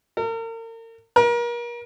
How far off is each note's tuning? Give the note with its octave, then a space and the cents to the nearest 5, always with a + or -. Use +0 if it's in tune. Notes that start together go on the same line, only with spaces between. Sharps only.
A#4 -40
A#4 +35